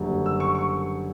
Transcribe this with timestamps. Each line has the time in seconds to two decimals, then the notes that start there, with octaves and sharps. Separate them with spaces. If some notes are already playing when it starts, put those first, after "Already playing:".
Already playing: F#1 F#2 D3 G3
0.26 E6
0.40 C#6
0.55 C#6